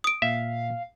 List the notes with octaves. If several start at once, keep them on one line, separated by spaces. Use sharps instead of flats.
D#6 D7
A#2 E5 F5